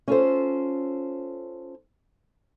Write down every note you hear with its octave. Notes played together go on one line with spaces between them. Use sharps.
C#4 F4 A4 C5